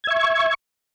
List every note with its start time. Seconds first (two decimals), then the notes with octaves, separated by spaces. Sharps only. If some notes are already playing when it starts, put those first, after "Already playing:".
0.04 G#6
0.07 E5
0.11 C#6